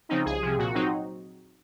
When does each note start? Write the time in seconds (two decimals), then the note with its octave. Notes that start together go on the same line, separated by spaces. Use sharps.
0.09 C#3 F3 C4 D#4
0.25 C2 G#4
0.42 C3 F3
0.58 A#2 F#4
0.74 F#3 C4 D#4